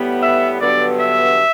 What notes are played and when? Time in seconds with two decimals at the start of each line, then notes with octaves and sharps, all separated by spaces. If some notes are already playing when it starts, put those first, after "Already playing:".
Already playing: A2 G3 B3
0.22 E5
0.61 G2 D3 F#3 B3 D5
1.00 E5